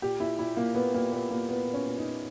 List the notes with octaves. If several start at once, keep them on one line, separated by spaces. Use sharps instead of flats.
A#2 G4
A#2 E4
A#2 E4
A#2 A#3
A#2 B3
A#2 A#3
A#2 B3
A#2 A#3
A#2 B3
A#2
C#4
A#2
D#4
A#2